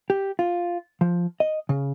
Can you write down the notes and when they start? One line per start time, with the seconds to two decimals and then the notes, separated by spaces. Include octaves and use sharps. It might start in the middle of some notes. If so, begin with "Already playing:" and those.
0.10 G4
0.39 F4
1.01 F3
1.40 D#5
1.69 C#3